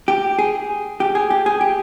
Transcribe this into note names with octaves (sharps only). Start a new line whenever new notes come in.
G4
G#4
G4
G#4
G4
G#4
G4